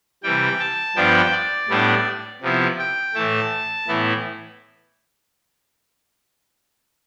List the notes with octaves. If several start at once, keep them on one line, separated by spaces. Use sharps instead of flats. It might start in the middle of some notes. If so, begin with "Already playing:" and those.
C3 E3 G3 G5
A5
G2 F3 B3 D4 G5
D5
A2 G3 B3 D4
C3 F3 B3 E4
G5
A2 E3 A3 A5
A2 E3 B3 E4